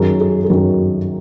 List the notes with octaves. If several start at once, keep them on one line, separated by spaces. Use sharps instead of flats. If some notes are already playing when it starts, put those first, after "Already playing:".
Already playing: F#2 D#3 F#3 G#4
G#4
G#4
F#2 D#3 F#3 F#4